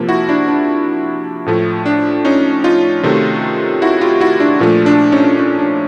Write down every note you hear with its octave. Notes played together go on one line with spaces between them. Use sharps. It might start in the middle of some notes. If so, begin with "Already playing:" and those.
Already playing: C3 F3 A#3
E4 F#4
D4 E4
D4
A2 F3 A3
D4
C#4 D#4
D#4 F4
C3 D#3 F#3 A3
E4 F#4
F4 G4
E4 F#4
D4 E4
A#2 F3 A3 D4
D4
C#4 D#4
D4
D4